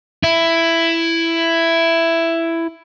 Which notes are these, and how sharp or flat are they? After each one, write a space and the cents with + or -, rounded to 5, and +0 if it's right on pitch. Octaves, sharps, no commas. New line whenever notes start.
E4 +10